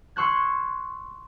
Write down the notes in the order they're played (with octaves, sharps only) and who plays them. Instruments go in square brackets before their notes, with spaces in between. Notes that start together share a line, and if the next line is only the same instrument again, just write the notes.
[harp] C6 C#6 E6 F#6 G#6